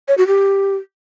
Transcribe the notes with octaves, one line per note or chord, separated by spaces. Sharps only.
C#5
F#4
G4